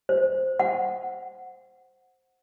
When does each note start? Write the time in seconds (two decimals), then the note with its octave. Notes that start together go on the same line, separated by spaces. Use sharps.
0.09 C5
0.60 F#5